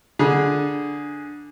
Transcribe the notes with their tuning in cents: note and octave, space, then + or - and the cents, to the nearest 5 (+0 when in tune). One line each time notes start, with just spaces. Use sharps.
D3 +0 G#4 +0 B5 -35